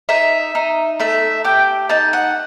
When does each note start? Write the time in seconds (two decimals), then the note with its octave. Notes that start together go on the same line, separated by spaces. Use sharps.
0.09 D#4 E5
0.55 D#4
1.00 A3 E5
1.44 G4 G5
1.89 D#4 A5
2.13 F#5